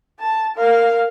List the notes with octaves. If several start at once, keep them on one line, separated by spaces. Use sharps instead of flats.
A5
A#4 F5